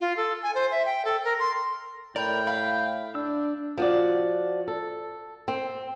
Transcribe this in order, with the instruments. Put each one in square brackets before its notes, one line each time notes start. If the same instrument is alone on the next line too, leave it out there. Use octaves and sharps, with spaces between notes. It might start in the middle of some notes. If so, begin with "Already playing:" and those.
[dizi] F4
A4
G#5
C5
E5
G5
A4
A#4
C6
[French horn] A2 [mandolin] A#4 [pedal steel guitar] D5 B5 [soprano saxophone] G5
[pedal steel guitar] E5 B5 [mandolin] F5
[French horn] D4 [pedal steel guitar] E6
[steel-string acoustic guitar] F3 F#4 D5
A4
C4